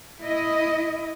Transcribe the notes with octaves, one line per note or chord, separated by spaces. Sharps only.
E4 D#5